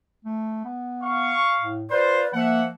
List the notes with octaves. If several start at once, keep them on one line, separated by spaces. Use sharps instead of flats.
A3
B3
F5 C#6
A2
F4 B4 C5 D5
F3 A#3 E5 F#5